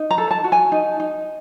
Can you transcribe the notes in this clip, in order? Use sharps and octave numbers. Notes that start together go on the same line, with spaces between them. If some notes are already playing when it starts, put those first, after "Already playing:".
Already playing: D#4
A#5
A4
A5
F#4
G#5
D#4
D#4